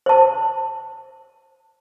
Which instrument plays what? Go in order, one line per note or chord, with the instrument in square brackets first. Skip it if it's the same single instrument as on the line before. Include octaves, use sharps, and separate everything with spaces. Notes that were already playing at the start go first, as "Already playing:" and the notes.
[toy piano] C5 A5